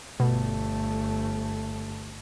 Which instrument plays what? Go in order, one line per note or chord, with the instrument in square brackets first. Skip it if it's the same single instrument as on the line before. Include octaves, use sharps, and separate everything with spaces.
[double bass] G1 A3 [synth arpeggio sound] B2